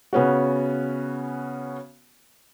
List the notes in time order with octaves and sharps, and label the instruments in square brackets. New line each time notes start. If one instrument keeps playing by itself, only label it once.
[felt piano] C#3 B3 C#4 F#4